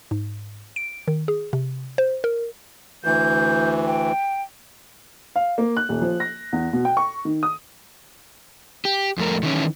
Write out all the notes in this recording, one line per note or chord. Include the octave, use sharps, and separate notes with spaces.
G#2
D7
D#3
G#4
C3
C5
A#4
D2 E3 G6
G5
F5
A#3
F#6
D#1
F3
A#6
E2
B2
G5
C#6
D#3
D#6
G4
F2 A3 A#4
D#3 E3 C#4 E4